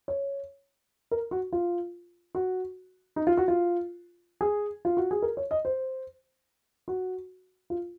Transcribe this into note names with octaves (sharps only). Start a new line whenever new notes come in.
C#5
A#4
F#4
F4
F#4
D#4
F4
F#4
F4
G#4
F4
F#4
G#4
A#4
C#5
D#5
C5
F#4
F4